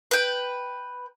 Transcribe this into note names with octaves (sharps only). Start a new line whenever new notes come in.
B4 G5